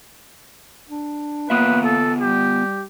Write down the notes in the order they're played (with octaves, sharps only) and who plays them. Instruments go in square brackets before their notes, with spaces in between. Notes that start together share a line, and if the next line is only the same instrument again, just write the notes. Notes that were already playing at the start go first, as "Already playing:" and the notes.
[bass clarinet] D4
[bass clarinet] A#3 [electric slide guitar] B3 F4 E5 [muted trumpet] B4
[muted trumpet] A4
[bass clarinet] G3 [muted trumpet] G4